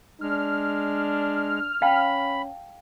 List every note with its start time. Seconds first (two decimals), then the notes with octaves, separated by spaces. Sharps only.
0.21 G#3 D4 F6
1.82 C#4 F5 G5 A5 B5